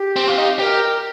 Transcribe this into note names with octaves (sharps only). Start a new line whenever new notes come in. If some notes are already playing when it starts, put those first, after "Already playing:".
Already playing: G4
C4
F4
D#4
G4 A#4 C5